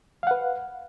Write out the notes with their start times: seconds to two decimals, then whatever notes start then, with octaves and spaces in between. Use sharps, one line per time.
0.23 F5
0.27 F#5
0.31 B4